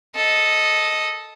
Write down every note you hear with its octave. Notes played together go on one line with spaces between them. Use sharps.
A4 D#5